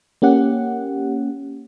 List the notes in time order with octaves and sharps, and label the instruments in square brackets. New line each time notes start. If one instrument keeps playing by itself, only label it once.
[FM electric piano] A#3 C#4 G4 F#5